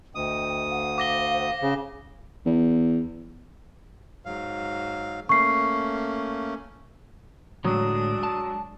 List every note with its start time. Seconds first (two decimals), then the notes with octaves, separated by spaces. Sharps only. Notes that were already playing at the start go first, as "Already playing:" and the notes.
0.15 D2 D#5 G5 D#6
0.70 C5 F5 F#5
0.98 D6 A#6 G7
1.62 C#3
2.45 E2
4.25 G#2 F#3 F5
5.29 A3 A#3 C#4 C#6 C7
7.64 A2 D3 F#3 G#3 D4 D#6
8.23 A5